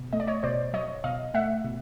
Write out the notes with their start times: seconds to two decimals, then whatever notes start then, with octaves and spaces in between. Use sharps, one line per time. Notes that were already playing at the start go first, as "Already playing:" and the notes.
Already playing: B2
0.13 A3 D#5
0.20 D5
0.27 C#5 D#5
0.43 B2 C5 D5
0.73 F#3 C#5 D#5
1.04 B2 D#5 F5
1.34 A3 E5 F#5
1.65 B2